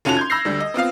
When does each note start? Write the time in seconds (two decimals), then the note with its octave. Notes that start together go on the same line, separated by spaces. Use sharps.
0.05 F1 C#4 F4 F#4 A5 F7
0.17 C6 G6 G#6
0.30 B5 E6 G6 A#6 C7
0.45 D2 D3 G3
0.60 D#5
0.74 B3 C4 F4 F5